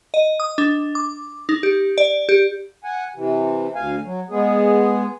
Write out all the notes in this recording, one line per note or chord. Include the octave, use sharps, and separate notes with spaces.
D#5
D#6
D4
D6
D#4
G4
D5
G4
F#5 G#5
C3 E3
D2 F5 G#5
F#3
G#3 B3 G#4